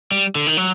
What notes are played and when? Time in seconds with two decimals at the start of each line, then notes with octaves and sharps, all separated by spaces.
0.11 G3
0.35 D3
0.47 D#3
0.57 F#3